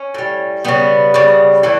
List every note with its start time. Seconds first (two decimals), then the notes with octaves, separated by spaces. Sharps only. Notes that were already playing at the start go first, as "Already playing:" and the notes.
Already playing: C#4
0.14 A2 G3
0.64 C#3 G3 B3
1.14 C#3 G3
1.63 A2 E3 A3